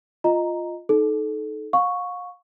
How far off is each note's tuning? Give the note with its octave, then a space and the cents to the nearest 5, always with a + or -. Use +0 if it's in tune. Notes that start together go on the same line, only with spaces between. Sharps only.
F4 +0 D#5 +0 A#5 +0
D#4 +0 A4 -25
F5 +40 C#6 +0